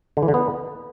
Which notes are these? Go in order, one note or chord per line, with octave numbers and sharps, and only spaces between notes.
D3
E3
D3
B3